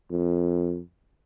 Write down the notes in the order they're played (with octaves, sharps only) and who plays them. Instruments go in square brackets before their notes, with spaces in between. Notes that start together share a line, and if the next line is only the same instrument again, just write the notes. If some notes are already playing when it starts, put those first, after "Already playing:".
[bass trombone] F2